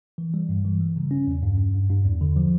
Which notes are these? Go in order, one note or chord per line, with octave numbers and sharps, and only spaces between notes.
E3
G3
G2
E3
G3
C#3
C#4
E2
G2
G2
G2
G2
E2
D3
F3